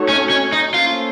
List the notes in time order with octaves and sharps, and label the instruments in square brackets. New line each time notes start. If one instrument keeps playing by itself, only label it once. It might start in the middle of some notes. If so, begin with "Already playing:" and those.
Already playing: [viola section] A3 D#4 F#4 A4 C#5
[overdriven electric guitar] C#4
C#4
D#4
[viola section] A#3 C#4 A4 C5 [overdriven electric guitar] F4